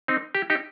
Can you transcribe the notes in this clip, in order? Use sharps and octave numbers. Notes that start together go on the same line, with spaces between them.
C4 D#4
G4
D#4 G4